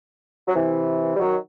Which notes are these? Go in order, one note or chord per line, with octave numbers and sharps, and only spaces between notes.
F#3
C3 E3
G3
D#3 F#3